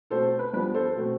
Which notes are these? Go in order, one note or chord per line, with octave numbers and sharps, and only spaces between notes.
B2 A3 C4 A4 C5
B4
G2 F3 B3 B4
A4 C5
B2 A3 C4